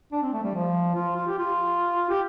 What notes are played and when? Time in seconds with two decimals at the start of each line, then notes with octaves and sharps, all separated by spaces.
0.12 D4
0.22 C4
0.33 A3
0.43 G3
0.54 F3
0.95 F4
1.16 F4
1.28 G4
1.39 F4
2.09 G4